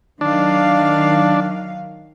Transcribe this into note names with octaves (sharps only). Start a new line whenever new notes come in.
D#3 F#3 D4 F5